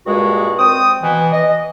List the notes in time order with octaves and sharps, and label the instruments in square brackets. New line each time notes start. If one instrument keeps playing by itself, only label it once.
[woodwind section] G2 A#2 G#3 F#4 G#4
C4 D#6
B2 E3
D#5